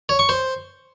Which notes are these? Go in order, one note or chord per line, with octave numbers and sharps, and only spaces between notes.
C#5
C#6
C5